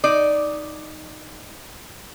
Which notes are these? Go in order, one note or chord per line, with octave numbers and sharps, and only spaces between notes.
D#4 D5